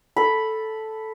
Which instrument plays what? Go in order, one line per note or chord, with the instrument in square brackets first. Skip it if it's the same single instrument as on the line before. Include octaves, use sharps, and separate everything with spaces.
[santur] A4 B5